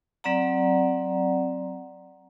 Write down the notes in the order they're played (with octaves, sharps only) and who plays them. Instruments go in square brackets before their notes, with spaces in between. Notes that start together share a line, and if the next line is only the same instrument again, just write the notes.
[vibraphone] F#3 C4 D5 F#5 A#5